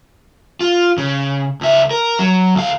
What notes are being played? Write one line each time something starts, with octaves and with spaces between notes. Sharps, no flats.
F4
C#3
C#2 E5
A#4
F#3
D2 F5